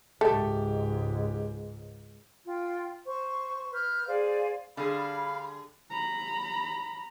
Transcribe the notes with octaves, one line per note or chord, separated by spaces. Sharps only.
C#2 G#2 A3 G4
F4 G5
C5 C#6
B4 F6 G6
G#4 C5 D5 F5
D3 G3 G#4 F5 B5
A#5 B5